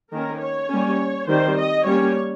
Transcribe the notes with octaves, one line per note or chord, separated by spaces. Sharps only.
D#3 A#3 C#4 A#4
C#5
G3 A#3 C#4
D#3 G3 C4 C5
D#5
G3 A#3 C#4 C#5